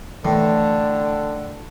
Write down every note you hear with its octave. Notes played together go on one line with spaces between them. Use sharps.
A2 D3 E3